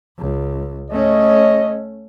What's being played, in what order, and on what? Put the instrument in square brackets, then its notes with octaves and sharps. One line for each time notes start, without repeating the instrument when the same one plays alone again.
[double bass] C#2
[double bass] A3 C#4 [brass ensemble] C#5 D#5